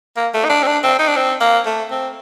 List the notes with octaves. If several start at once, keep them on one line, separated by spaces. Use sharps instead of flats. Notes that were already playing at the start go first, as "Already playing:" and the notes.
A#3
A3
D#4
D4
C4
D4
C4
D#4
D4
C4
A#3
A3
C4